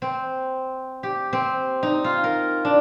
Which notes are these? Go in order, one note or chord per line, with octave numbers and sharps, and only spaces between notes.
C4
G4
C4
D#4
F4
A#4
D4